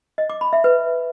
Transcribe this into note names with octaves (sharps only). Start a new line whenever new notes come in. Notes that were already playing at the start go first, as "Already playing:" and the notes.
D#5
D6
B5
E5
B4